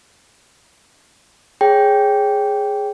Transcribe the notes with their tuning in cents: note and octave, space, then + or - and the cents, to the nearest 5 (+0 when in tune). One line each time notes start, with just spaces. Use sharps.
G#4 +0 C#5 +0 G5 +0